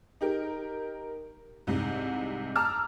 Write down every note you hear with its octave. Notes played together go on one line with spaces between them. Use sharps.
D#4 G4 A#4
C2 G#2 C3
A5 A#5 D6 E6 F6